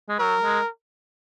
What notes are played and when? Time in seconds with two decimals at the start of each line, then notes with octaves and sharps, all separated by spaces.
0.09 G#3
0.19 F#3 A#4
0.43 G#3